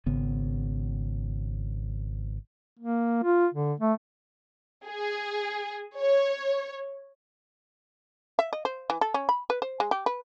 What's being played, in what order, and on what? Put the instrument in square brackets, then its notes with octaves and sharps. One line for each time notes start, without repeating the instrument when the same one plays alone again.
[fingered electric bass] G#1 C#3 B3
[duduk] A#3
F4
D3
A3
[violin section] G#4
C#5
[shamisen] E5
D#5
C5
E3
A4
C#4
B5
B4
C5
G#3
G4
B4